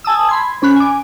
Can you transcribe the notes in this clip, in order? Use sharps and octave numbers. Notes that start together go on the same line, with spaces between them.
G#5 A5 D#6 E6
B5 C6 G#6
C3 C#4 B5 F#6
G#5 D6